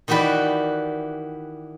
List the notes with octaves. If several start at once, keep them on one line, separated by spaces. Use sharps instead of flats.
D#3 E3 F#4 G4 B4 D5